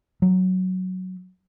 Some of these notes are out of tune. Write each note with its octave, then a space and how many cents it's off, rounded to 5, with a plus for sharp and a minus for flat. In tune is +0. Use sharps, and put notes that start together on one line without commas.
F#3 +0